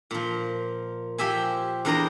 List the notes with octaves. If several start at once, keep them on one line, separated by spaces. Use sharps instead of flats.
A#2 F3
F3 G4 E5 G#5
E2 D4 A#4 C5 D#5 A#5